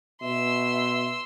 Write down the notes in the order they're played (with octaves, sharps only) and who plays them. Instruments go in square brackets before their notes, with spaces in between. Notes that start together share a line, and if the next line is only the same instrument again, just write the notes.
[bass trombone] B2 [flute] E5 [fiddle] C6 E6